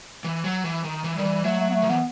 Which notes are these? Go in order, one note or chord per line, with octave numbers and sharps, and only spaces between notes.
E3
F#3
E3
D#3
E3
D#3 G3
E3
F#3 A3
A3
B3
A3
D#3
E3 B3